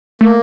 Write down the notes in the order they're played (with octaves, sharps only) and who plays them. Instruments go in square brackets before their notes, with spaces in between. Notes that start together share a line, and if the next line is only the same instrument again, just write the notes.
[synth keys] A3 [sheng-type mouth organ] A#3